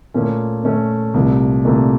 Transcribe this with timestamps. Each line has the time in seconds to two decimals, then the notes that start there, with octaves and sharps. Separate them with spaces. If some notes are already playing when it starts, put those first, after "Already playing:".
0.14 A#2 A3 C#4
0.64 A#2 A3 C#4
1.14 C2 A#2 A3
1.65 C2 A#2 A3